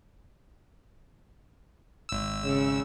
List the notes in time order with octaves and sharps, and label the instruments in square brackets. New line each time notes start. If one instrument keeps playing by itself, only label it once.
[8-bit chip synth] G#1 E6
[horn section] C#3